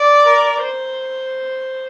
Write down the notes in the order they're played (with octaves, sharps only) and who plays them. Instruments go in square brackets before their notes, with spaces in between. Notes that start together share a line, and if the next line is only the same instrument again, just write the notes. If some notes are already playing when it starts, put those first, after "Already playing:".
Already playing: [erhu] D5
[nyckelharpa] A#4
C5